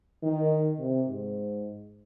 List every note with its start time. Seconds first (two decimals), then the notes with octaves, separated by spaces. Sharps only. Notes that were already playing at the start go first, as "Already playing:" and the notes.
0.23 D#3
0.79 C3
1.08 G#2